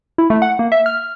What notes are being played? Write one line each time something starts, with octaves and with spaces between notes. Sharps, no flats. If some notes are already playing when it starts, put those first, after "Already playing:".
E4
A3
F#5
A#3
E5
F6